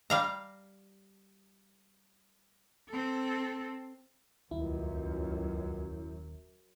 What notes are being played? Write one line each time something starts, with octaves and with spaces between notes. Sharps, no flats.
G3 F5 A#5
C4 A4
D#1 C#2 F#2 E4